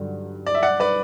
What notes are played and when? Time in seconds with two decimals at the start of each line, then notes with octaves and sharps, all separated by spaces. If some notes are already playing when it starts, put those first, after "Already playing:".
Already playing: G2 D3 F#3
0.46 D5
0.54 E5
0.63 D5 F#5
0.80 B4 D5